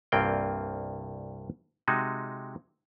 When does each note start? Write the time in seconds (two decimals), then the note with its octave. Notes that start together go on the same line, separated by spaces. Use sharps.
0.12 C2 G2 A#3 C4 F4 G5
1.88 C3 G#3 D#4 F#4